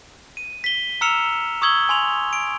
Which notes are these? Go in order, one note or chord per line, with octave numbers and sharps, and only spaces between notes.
D#7
B6 G7
A#5 E6 F6 C#7 E7 F7
C#6 D#6 E6 G#6 F#7 G7
G#5 C6 F7
D7